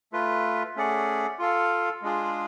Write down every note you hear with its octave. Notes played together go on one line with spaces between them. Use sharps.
A3 F4 B4
A3 C#4 G#4 D5 F#5
F4 A4 F5
G#3 D4 F4 G#4